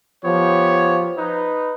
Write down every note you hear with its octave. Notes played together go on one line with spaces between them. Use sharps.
F3 B3 G4 C#5
D#4 B4